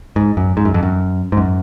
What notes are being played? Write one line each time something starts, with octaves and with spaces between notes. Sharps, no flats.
G#2
F#2
G#2
F#2
F2
F#2
G#2
F#2